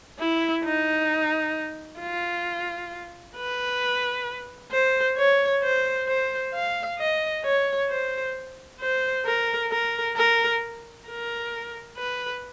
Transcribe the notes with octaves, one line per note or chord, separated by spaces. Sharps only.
E4
D#4
F4
B4
C5
C#5
C5
C5
F5
D#5
C#5
C5
C5
A#4
A#4
A#4
A#4
B4